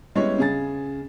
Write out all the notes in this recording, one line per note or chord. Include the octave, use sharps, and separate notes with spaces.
G3 G#3 B3 C#4 E4 C#5
C#3 G#4 A6